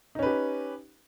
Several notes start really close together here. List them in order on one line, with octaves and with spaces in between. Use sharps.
D#4 C#4 B4 G4